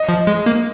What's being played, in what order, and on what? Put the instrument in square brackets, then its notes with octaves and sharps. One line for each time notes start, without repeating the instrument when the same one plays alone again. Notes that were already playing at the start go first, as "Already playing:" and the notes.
Already playing: [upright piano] D#5
[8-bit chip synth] F3
G#3
A#3